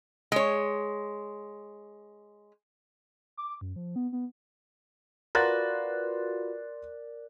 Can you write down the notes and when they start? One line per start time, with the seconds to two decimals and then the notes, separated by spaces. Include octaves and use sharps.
0.32 G#3 C#5
3.37 D6
3.61 F#2
3.76 F3
3.96 B3
4.12 B3
5.35 F4 F#4 A#4 B4 D5 C6 F#6 A6